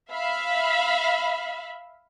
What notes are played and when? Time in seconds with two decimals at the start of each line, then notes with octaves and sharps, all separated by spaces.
0.11 E5 F5 B5